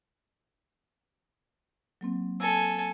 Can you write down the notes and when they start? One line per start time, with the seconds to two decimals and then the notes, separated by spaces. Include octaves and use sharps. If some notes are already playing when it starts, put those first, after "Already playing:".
2.01 F#3 A#3 C4
2.40 A4 G#5 E6